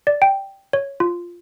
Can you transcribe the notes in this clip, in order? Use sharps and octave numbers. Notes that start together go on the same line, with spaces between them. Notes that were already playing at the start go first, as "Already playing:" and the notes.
D5
G5
C#5
F4